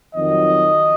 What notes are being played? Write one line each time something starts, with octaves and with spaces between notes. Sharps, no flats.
F2 D#3 F#3 D#5